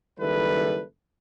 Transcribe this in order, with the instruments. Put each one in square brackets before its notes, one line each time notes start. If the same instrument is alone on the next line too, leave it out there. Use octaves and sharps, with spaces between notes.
[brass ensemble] F#1 D#3 G3 E4 A4 B4